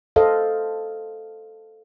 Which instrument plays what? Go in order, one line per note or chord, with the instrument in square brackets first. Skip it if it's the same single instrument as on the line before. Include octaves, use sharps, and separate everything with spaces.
[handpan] A4 C5 D#5 F5